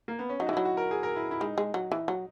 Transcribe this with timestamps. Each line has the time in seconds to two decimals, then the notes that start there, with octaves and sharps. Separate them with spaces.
0.08 A#3
0.19 B3
0.29 C#4
0.40 F#3 D#4
0.47 E3 F#4
0.53 F#3 E4
0.65 F#4
0.77 A#4
0.91 G#4
1.03 A#4
1.16 E4
1.31 E4
1.40 G#3 D#4
1.58 G#3
1.74 F#3
1.92 E3
2.08 F#3